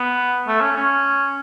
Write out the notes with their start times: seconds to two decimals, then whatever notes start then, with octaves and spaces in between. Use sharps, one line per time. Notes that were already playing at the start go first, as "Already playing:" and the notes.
Already playing: B3
0.47 A3
0.61 C#4
0.76 C#4